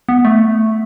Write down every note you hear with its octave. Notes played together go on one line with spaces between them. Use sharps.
B3
A3